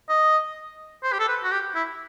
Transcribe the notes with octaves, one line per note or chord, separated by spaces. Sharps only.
D#5
C5
G4
A4
B4
F#4
G4
E4